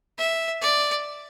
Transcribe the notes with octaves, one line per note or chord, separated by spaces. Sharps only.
E5
D5